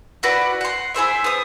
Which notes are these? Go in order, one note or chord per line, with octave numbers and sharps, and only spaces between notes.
E4 F#4 B4 D5
F#5 C6
E4 G#4 C5 E5
B3 D#6